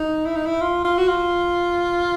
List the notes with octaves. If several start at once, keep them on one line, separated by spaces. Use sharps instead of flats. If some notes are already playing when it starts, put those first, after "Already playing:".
Already playing: D#4
E4
D#4
E4
F4
F4
F#4
F4